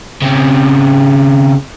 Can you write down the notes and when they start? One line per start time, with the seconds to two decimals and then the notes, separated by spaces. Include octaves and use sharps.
0.22 C#3 C4